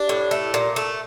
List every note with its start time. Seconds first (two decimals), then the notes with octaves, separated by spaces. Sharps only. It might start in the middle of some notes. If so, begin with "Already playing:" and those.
Already playing: D4 G4
0.09 A2
0.31 A3
0.54 A#2
0.76 A3